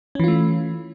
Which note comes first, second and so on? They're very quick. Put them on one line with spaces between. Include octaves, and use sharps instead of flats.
C#4 E3 F4 A3